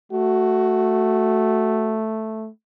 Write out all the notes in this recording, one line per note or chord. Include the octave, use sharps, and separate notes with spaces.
A3 F#4